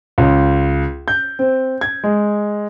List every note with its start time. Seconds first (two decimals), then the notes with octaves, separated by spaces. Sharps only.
0.18 C#2
1.08 G6
1.39 C4
1.81 G#6
2.04 G#3